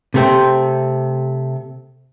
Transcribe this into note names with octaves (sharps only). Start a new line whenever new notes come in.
C3 A3 C4